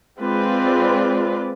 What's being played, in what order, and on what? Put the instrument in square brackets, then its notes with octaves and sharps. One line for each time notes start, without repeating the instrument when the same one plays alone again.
[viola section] G#3 C4 F4 B4 D5